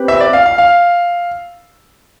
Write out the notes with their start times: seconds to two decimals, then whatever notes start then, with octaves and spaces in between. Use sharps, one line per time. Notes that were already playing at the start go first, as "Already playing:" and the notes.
Already playing: C4 G4 B4
0.08 E5
0.20 D5
0.33 F5
0.46 F5
0.58 F5